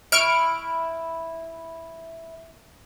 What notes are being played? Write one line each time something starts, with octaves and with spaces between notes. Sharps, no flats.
E4 C#6 F6 D7